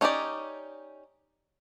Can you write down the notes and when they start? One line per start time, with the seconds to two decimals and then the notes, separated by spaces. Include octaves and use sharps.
0.01 C#4 D#4 F4 G4 D5